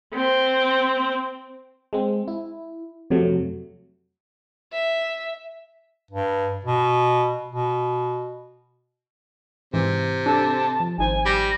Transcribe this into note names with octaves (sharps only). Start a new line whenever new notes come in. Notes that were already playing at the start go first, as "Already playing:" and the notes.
C4
G#3 C4
E4
F2 C3 F#3 A3
E5
G2
B2
B2
G#2 C3 E3
D4 G4 A4 A5
F3
G#1 D#4 C5 G#5
G3 A#6